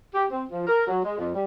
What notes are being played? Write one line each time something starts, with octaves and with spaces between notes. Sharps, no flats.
G4
C4
F3
A#4
F#3
G#3
F2
G3